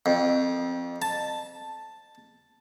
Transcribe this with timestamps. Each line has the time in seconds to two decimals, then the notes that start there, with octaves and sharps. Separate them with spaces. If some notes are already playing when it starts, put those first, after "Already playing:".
0.06 F2
1.02 A5